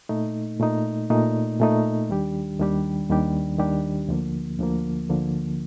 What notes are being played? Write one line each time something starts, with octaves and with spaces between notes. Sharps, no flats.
A#2 A3 D#4
A#2 A3 D#4
A#2 A3 D#4
A#2 A3 D#4
D#2 D#3 G3 D4 G4
D#2 D#3 G3 D4 G4
D#2 D#3 G3 D4 G4
D#2 D#3 G3 D4 G4
D2 D3 F3 A#3
D2 D3 F3 A#3
D2 D3 F3 A#3